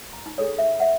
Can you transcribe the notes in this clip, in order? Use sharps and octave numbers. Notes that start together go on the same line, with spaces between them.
A#5
D#4
D4 G#4 A4 C#5
E5
E5 F#5